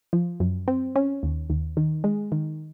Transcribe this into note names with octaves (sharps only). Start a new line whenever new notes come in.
F3
F#2
C4
C#4
D#2
D#2
D#3
G#3
D#3